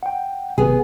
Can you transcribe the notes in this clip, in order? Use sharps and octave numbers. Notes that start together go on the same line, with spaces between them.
F#5 G5
G#1 C3 B3 G#4